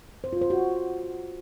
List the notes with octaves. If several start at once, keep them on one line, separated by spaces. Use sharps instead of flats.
C5
F4
C5
F#4